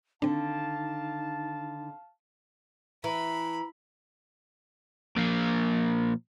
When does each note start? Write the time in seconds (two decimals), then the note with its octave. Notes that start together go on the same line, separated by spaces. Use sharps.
0.22 D3 D#3 C4 D4 D#4 F5 A5
3.04 E3 A#5 B5
5.17 A#2 F3